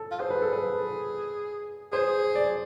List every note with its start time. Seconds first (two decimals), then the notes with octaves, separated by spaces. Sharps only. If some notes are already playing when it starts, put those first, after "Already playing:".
Already playing: A4
0.11 F4
0.20 G#4 C5
0.31 B4
0.42 A4
0.53 B4
1.92 G#4 C5
2.35 D5